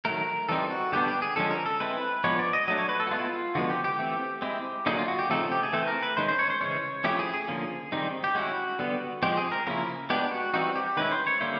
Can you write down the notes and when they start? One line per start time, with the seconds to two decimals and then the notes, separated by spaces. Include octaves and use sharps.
0.05 D#3 F#3 A3 A#4
0.49 E3 G3 C4 D#4 A4
0.71 F#4
0.92 D3 G3 B3 D4 G4
1.08 G4
1.22 G#4
1.36 D3 F3 G#3 C#4 A4
1.51 A#4
1.66 A4
1.80 G#3 C4 E4 B4
2.24 F3 G#3 B3 D4 C#5
2.39 D5
2.53 D#5
2.68 F#3 A3 D4 D#5
2.79 C#5
2.89 B4
3.00 A4
3.07 F#4
3.11 G#3 B3 E4 F4
3.55 D3 F3 G#3 B3 F#4
3.70 G4
3.84 G4
3.99 E3 A3 C4
4.42 G#3 C4 E4
4.86 D3 F#3 A#3 D#4 G#4
4.99 F4
5.08 F#4
5.19 G4
5.30 C#3 F3 A3 C4 D#4 A4
5.52 G4
5.63 G#4
5.73 E3 A3 C4 A4
5.87 A#4
6.03 B4
6.17 D#3 G#3 C#4 C5
6.28 C5
6.39 C#5
6.50 C5
6.61 C#3 E3 G#3 C#4 C#5
7.04 F3 A3 C#4 E4 G4
7.19 G#4
7.33 G#4
7.48 D3 F3 A#3 C#4
7.92 D#3 G3 C4 D#4
8.24 G4
8.35 G#3 C#4 E4 F#4
8.79 D3 G3 B3
9.23 F3 G#3 C4 G4
9.37 G#4
9.52 A#4
9.67 C#3 F3 A#3 C#4 E4 A#4
10.10 G#3 B3 D4 G4
10.31 F#4
10.54 E3 G3 C4 D#4 F#4
10.75 G4
10.97 D#3 G#3 C#4 E4 B4
11.11 C5
11.27 C#5
11.41 D3 G3 A#3 C#4 E4 C5